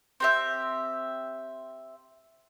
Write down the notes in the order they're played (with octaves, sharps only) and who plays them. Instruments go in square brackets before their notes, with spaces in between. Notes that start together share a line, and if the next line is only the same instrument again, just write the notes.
[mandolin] C4 G4 E5